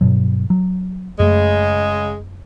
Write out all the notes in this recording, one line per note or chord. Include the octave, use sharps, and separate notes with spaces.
G2 B2 F#3
F#3
F#2 C#3 G#3 A3